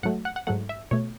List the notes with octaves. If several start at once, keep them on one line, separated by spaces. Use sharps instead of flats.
G#2 F#3 A3 F#5
F#5
F#5
G#2 F#3 A3 F#5
E5
B2 A3 C#5